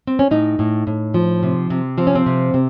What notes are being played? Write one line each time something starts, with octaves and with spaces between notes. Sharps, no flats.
C4
C#4
A2 D#4
A2
A2
F3
C3
C3
F3 C4
C#4
C4
C3
C3